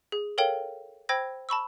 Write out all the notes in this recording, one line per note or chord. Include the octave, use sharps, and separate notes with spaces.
G#4
A4 A#4 C#5 F5 G5 G7
C5 G5 B5 E6 G#6 A#6
A5 B5 C#6 E6